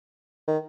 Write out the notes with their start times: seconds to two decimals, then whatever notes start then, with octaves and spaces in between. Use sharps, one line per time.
0.48 D#3